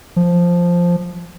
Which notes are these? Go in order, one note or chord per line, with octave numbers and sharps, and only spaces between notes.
F3